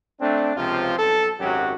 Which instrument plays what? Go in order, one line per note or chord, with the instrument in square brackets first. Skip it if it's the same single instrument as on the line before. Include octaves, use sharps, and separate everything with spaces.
[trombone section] A3 C4 D4
C#2 C3 F3 C4 F4
B1 A4
G#1 F#2 F#3 F#4 G4